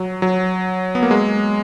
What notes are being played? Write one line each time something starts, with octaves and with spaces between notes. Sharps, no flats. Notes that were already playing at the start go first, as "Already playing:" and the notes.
Already playing: F#3
F#3
B3
A#3
G#3